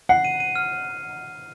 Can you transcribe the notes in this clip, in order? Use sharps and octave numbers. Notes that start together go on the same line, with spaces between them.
F#5 C7
D#7
D#7
F6